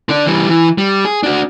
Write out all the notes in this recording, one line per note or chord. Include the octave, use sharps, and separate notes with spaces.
D3 D4
E3 G3
E3
G3
G#4
D4 F#4